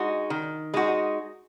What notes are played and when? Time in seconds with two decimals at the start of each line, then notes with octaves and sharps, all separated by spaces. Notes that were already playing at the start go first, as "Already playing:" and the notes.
Already playing: G#3 D#4 F#4
0.30 D#3
0.74 G#3 D#4 F#4